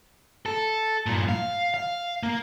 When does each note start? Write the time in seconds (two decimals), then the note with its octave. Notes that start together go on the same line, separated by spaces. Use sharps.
0.46 A4
1.06 G2 A#2
1.29 F5
1.74 F5
2.23 A#3